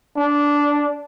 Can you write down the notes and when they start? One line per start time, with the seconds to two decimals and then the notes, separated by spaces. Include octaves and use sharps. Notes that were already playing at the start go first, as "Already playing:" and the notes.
0.17 D4